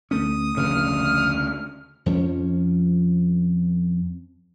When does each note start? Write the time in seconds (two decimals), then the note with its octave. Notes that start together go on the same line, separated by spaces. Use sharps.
0.11 D2 A3 C#4 D#6
0.57 F1 D2 C#3 F6
2.06 F2 F3 A#3 C#4